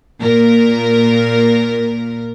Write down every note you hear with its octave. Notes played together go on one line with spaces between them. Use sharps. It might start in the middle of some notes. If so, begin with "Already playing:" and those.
A#2 A#4